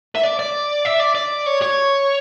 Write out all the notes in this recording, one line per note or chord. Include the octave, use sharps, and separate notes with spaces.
E5
D5
D5
E5
D5
D5
C#5
C#5